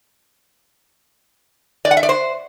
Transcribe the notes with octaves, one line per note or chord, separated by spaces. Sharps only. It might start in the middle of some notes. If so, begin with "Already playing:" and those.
D5
F#5
E5
D5
C5